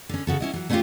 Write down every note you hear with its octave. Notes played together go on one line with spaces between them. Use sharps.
D3 C#4
C#3 F#4 A4
C#4 E4 D#5
E3 F#3
A3 C#4 D4 E4 F4 G4